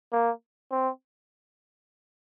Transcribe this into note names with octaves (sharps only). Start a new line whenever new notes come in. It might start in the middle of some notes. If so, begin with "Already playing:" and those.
A#3
C4